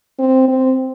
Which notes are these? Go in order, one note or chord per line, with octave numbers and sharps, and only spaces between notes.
C4
C4